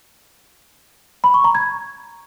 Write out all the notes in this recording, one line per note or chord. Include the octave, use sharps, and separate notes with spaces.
B5
C#6
A#5
G#6